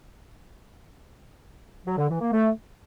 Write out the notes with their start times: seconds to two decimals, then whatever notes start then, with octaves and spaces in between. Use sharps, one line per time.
1.86 F#3
1.97 D3
2.09 E3
2.21 A#3
2.33 A3